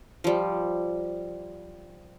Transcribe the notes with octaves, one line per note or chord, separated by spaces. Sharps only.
F3 G3